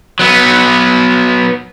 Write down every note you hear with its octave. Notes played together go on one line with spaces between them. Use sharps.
F#3 B3